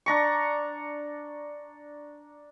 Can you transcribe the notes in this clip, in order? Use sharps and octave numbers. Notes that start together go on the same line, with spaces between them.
D4 A#5 C#6